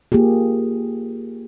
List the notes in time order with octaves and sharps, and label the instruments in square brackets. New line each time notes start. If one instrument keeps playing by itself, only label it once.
[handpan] A#3 F4 G4 G#4